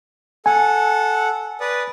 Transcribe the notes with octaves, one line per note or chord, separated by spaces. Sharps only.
A4 F#5 G#5
B4 D5 D#6